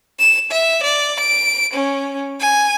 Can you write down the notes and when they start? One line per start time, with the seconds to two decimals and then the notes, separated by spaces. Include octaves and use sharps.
0.20 E7
0.51 E5
0.83 D5
1.20 D7
1.73 C#4
2.40 G#5